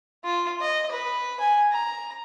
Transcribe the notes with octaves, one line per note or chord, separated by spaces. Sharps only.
F4
D#5
B4
G#5
A#5